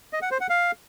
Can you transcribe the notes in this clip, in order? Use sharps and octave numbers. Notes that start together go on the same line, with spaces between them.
D#5
F#5
C5
F#5
F5